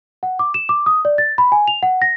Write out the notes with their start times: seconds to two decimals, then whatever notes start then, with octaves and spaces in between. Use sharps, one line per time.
0.23 F#5
0.39 D6
0.54 E7
0.69 D6
0.86 D#6
1.05 D5
1.18 A6
1.38 B5
1.52 G#5
1.68 F7
1.83 F#5
2.02 A#6